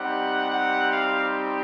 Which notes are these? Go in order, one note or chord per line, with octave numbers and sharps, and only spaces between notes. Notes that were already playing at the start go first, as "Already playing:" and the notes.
Already playing: G3 C4 D#4 G4 F#5
F#5
F5